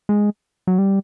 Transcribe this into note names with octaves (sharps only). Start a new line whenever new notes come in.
G#3
F#3
G3